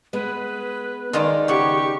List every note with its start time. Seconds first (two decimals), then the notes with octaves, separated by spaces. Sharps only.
0.13 G#3 B3 B4
1.13 D#3 G#3 D#4 F4 A#4 D5
1.48 C#3 B3 G4 C#6